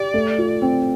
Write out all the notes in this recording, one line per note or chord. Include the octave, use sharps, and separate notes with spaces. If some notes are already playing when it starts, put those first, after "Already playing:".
Already playing: G4 D5
A3
F4
C4